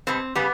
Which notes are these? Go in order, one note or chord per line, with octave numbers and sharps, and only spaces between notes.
B2 G3 C4
C#3 G3 B3